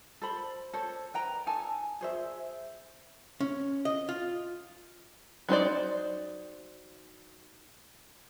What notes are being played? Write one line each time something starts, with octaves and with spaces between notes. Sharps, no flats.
A4 C5 B5
A4 C5 C#5
B4 G5 A#5
D#4 A4 G#5 A5
G#4 C5 E5
C#4
D#5
F4
F#3 D#4 C5 D5